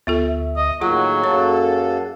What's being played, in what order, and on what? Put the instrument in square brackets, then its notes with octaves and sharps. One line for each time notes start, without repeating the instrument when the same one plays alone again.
[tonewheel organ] D2 E5 [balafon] B3 F4 A4
[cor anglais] D#5
[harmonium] A2 D#3 A#3 [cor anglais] F#3 [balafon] F4 C#6 [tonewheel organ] G#4 F#5
[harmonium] F#2 A#3 A4 [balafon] C#5